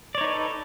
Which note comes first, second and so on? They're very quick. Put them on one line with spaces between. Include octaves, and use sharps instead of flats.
D5 C#5 D#4 B4 A4